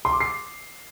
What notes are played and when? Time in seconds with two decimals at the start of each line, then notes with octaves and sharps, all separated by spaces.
0.05 C6
0.13 D6
0.20 C7